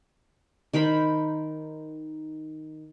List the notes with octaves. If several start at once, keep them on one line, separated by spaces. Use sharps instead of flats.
D#3 A#4 C5 B5